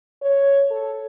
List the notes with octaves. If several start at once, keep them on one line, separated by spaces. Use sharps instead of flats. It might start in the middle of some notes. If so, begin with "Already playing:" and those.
C#5
A4